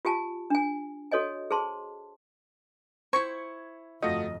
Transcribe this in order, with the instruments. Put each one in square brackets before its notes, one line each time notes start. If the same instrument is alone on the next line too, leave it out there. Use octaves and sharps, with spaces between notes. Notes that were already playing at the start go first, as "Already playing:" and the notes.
[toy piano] F4 G4 G#5 A5
D4 G#5
F#4 A4 C#5 D#5 G#5
G#4 C5 A5 C6
[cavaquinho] E4 C#6 [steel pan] C5 [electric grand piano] G#6 C#7
[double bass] G1 F2 [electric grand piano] A3 F4 F#4 [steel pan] D#5